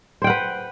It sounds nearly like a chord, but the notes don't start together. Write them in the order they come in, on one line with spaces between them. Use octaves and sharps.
C5 G5 F#5 B4